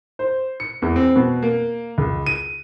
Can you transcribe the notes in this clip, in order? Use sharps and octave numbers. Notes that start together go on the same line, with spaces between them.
C5
C#7
E2
C4
B2
A#3
C#2
D#7